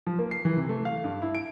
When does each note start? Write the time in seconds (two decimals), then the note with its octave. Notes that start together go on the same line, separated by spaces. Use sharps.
0.07 F3
0.19 A#3
0.31 C7
0.45 E3
0.57 C3
0.69 A3
0.85 F5
1.04 G2
1.22 E4
1.35 D7